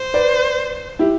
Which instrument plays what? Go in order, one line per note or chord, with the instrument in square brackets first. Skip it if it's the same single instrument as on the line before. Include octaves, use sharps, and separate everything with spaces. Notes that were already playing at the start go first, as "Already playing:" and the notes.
Already playing: [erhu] C5
[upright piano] B4 D5
E4 G4